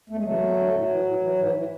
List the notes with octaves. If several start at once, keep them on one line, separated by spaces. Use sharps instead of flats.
E2 A3
G#3
C#3 E3 F#3 A3
E2
D3
A2 F#3
E3
A2
E3
G#2 E3
E3